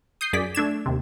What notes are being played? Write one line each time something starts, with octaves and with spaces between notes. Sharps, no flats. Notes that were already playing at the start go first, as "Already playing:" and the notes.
D#6 G6 C7
F#2 G#4 D5 B6
A3 D4 G#6 E7
D#2 C3